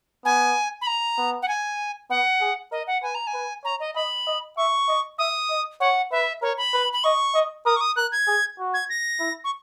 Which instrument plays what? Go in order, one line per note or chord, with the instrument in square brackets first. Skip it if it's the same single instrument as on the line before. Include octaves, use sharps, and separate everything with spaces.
[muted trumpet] B3 [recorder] G#5
[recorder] B5
A#5
[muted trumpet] B3
[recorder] F#5
G#5
[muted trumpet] B3 [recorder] F#5
[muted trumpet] G#4
[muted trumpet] A#4 [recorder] D#5
[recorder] F#5
[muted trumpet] B4 [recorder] G#5
[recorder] A#5
G#5
[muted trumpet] B4
[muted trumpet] C#5 [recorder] A#5
[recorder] D#5
[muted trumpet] D#5 [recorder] B5
[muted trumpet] D#5
[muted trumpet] E5 [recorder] C#6
[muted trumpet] D#5
[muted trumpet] E5 [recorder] D#6
[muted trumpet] D#5
[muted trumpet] C#5 [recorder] F#5
[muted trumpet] B4 [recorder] E5
[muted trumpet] A#4 [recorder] C#5
[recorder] B5
[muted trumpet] B4
[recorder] B5
[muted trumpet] D#5 [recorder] C#6
[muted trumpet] D#5
[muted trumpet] A#4 [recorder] D#6
[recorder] C#6
D#6
[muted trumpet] A#4 [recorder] F#6
[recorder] G#6
[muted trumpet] G#4
F#4
[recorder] G#6
A#6
[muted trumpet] E4
[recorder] C#6